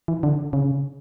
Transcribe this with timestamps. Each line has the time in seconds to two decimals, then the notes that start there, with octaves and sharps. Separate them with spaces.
0.08 E3
0.23 D3
0.53 C#3